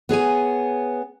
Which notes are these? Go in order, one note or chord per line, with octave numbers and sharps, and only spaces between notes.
B3 G#4 C#5 G#5